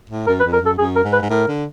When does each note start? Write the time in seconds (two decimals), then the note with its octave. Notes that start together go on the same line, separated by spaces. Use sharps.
0.10 A2
0.27 F#2 A#4
0.40 B4
0.45 F2
0.53 A#4
0.61 F#2 A4
0.79 F#2 G#4
0.96 A#4
1.04 G#2
1.13 B4
1.22 G#2
1.30 A2 A#4
1.47 D3